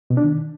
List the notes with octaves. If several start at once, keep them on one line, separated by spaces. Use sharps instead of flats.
B2
D4
D#3